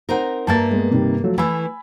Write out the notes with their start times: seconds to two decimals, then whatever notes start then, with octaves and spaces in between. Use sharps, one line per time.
0.09 C4 D#4 A#4 C5 F#5 A#5
0.47 G2 A#3 E5 A5 A#5 A6
0.71 G#3 B3
0.91 C3 D#3 G3
1.24 F3 F#3 A3
1.38 E3 A3 G#5 B5 E6